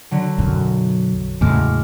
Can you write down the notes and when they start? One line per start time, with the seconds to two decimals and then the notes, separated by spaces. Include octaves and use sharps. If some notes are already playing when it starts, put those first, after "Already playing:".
0.11 D3 F#3
0.38 B1 F#2
1.41 E2 A2 C#3 G#3 D6 F6